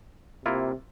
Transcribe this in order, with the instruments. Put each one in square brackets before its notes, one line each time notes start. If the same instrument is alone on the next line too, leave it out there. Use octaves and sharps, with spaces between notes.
[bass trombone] C3 [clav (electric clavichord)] A#3 E4 F4